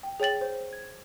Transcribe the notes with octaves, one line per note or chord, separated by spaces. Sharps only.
G5
G#4 C#5 G5 A6 F#7
C5
G#6